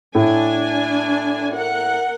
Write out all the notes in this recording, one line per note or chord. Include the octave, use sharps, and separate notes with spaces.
A2 D4 G#5
A#4 F#5